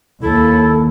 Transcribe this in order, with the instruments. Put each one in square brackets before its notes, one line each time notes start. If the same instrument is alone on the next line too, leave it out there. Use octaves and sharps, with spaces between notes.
[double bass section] D#2 [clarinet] E4 [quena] A4